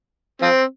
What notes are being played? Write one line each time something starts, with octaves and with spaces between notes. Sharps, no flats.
F3 C4